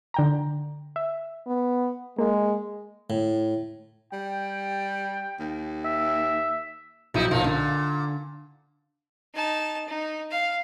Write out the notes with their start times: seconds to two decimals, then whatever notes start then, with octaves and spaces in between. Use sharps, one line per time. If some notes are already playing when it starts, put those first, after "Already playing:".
0.14 D3 G5 A#5
0.96 E5
1.47 B3
2.18 G#3 A#3
3.10 A2
4.13 G3 G5
5.39 D#2
5.85 E5
7.14 A#1 F#3 D#4 E4 D#7
7.31 B1 A#2 F3 D#4
7.44 A#2 D3
9.34 D#4 A5
9.87 D#4
10.31 F5